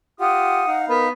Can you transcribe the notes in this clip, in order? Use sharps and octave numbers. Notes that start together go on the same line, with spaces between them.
F4 G4 F#5 D#6
D#4 F5
B3 A#4 B5